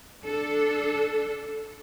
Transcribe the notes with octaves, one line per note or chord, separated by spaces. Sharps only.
D4 A4